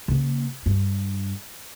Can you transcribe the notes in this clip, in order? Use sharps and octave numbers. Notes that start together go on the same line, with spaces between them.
C#3 A#3
G2